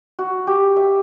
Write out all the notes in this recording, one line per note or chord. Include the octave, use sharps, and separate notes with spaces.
F#4
G4
E5